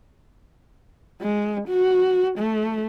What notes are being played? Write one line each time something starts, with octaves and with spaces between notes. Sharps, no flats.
G#3
F#4
A3